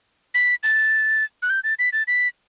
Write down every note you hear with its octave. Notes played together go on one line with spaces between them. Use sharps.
B6
A6
F#6
G6
A6
B6
A6
B6